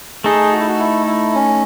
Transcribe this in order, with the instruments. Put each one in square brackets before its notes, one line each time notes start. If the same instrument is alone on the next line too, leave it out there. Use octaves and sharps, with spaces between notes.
[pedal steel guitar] A3 D#4 A4 [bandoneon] G#4
[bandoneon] F#4
E4
F#4
E4
E4
C#4